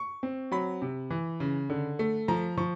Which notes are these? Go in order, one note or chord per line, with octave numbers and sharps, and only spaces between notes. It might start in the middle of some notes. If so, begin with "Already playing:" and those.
Already playing: C#6
C4
F#3 B5
C3
E3
C#3
D3
A3
F3 A#5
F3 C#6